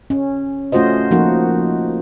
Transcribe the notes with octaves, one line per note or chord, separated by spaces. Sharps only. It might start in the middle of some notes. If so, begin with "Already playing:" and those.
C#4
A3 C#4 F4 F#4 C5 D#5
F3 A#3 D#4 F#4